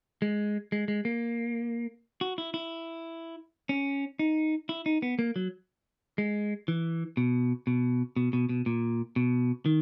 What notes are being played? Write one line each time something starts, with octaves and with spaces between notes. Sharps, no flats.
G#3
G#3
G#3
A#3
F#4
E4
E4
C#4
D#4
E4
D#4
B3
A#3
F#3
G#3
E3
B2
B2
B2
B2
B2
A#2
B2
D#3